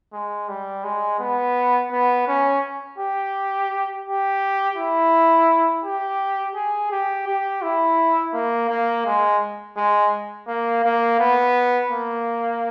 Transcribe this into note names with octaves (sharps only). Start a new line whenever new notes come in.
G#3
G3
G#3
B3
B3
C#4
G4
G4
E4
G4
G#4
G4
G4
E4
A#3
A#3
G#3
G#3
A#3
A#3
B3
A#3